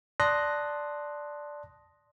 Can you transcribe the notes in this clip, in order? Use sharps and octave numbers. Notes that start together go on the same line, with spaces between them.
D5 A5 C6 D#6 F#6 A#6